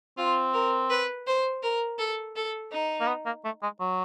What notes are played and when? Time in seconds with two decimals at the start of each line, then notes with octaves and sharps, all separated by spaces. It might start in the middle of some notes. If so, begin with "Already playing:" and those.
0.18 C4 F4
0.54 A#4
0.90 B4
1.27 C5
1.63 A#4
1.99 A4
2.36 A4
2.72 D#4
3.01 A#3
3.08 B3
3.26 A#3
3.45 A3
3.63 G#3
3.81 F#3